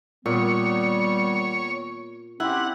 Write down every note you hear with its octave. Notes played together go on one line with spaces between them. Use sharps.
A#2 D#3 G3 B3 C#5
C4 C#4 E4 G4 F#5